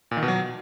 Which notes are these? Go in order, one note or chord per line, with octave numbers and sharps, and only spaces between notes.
A#2
D#3
B2
F#3